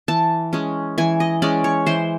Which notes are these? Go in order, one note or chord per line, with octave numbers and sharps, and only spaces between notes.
E3 A5
G#3 C#4
E3 G#5
D#5
G#3 C#4 D5
C#5
E3 C5